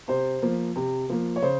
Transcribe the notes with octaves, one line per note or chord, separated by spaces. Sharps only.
C3 C5
F3 A#3
C3
F3 A#3
C#5
C#3 C5